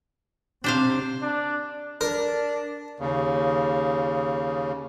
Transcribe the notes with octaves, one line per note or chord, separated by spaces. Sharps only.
C3 D4 C5 F5
D4
D4 A#4
D#2 C#3